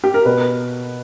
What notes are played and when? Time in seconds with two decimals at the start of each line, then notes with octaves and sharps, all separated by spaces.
0.04 G4
0.14 A#4
0.25 B2 B4